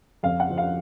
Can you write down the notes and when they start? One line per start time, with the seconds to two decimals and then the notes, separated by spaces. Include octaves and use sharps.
0.23 F2 F5
0.40 F#5
0.49 F3
0.58 F5